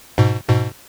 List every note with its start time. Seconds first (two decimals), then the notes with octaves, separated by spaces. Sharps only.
0.18 G#2 B2
0.48 G#2 B2